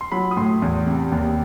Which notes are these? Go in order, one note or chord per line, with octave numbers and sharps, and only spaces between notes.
C6
F#3 B5
D#6
A2 C6
E2
C3
D#2